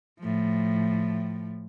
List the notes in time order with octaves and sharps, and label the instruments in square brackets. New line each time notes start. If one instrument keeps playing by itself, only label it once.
[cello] A2 F3